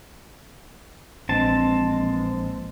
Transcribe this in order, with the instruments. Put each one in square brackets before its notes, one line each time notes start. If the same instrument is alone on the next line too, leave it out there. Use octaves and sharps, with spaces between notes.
[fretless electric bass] A#1 [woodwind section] E3 G#3 [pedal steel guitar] C4 A5